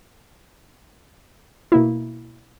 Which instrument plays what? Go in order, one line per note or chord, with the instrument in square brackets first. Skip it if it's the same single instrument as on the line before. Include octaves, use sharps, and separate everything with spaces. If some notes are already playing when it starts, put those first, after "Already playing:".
[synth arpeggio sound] B2 A#3 E4